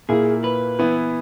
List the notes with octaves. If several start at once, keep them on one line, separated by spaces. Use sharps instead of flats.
A#2 A#3 E4 G#4
B4
E3 B3 E4